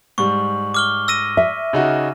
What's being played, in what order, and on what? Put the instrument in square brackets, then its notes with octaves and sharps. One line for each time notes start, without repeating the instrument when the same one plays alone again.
[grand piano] G#2 G3 [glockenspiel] C#6
[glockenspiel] D6 F6 G7
E6 A#6 D#7
[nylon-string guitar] E5
[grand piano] C#3 D#4 F#4